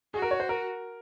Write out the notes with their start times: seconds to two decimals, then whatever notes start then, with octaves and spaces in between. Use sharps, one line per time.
0.14 F#4 G#4
0.22 A#4
0.31 C#5
0.40 C5
0.49 A#4